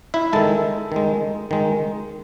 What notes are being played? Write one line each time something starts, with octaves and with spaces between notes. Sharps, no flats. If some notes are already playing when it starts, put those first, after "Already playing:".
E4 E5
D#3 G#3 A4 A5
D#3 G#3
D#3 G#3